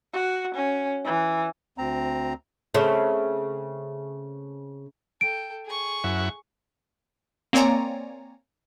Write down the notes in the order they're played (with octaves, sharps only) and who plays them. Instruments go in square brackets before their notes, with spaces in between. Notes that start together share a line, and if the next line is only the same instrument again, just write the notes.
[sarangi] F#4
C#4
E3
[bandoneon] D2 C4 A#5
[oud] C#3 C4 [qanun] A3
[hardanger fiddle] A4 G5 [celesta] D7
[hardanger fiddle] G#4 C#6
[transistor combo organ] F#2 E4 F#5
[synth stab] A#3 C4 C#5 D5 G#5 A#5